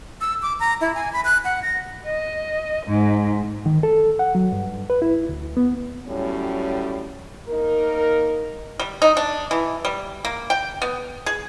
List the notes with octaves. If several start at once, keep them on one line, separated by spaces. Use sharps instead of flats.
E6
D6
A#5
E4
G#5
B5
F#6
F#5
A#6
D#5
G#2
D#3
A4
F#5
F#3
G2
B4
E4
D2
B3
A2 F#3 G3 C#4
A#3 D#4 A#4
G3
D#4
D4
E3
G3
A#3
G5
B3
G#4